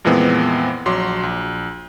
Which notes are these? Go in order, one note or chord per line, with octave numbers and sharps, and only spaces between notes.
F2 A#2 E3 G#3 B3 C4
A#1 F#3 C6 D6
A#1